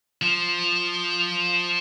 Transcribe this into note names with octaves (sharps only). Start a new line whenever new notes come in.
F3